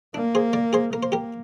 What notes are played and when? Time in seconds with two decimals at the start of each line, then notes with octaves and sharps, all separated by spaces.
0.14 A#3 D4
0.35 G#4 C5
0.53 A#4 D5
0.73 G#4 C5
0.93 A#3 A#4
1.03 C5
1.12 G4 A#4